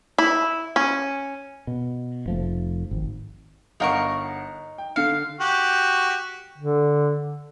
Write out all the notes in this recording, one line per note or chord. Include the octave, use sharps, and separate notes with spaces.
E4
C#4
B2
F1 F3 A3
G#1
G1 D#4 A#4 F5 F#5 C#6
G5
D3 F5 C#7
F#4 G4
D3